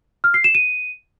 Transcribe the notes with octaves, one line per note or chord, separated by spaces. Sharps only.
F6
C7
E7
D#7